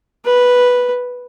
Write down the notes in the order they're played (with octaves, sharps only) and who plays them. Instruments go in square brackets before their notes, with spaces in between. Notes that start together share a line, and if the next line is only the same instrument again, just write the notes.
[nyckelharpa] B4